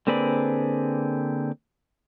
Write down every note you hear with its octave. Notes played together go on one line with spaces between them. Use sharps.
D3 A#3 C4 G#4 B4 D5